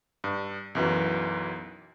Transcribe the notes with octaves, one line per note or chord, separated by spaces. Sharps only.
G2
B1 F#2 E3 F#4